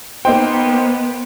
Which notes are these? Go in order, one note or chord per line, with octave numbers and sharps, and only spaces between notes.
A#3 B3 D#4 C5 G5